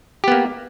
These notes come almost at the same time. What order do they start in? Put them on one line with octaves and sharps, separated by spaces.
G4 B3 A#3